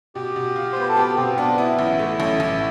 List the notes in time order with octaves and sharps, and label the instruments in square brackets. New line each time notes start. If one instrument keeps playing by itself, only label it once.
[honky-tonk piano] B2 [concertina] G4
[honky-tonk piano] B2
F4
[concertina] C5
[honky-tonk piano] B3 [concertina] B4
[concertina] A4
[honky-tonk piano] B3 [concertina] G4
[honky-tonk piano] B2 [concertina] C4
[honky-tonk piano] B3 [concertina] D4
[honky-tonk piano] B3 [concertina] E4
[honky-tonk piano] A1 [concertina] E4
[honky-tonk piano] A3
A1
A1